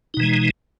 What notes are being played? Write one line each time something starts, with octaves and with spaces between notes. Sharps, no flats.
B2 E3 G#3 D#4